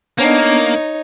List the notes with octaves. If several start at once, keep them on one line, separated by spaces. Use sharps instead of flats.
A#3 B3 D4 D#4 C#5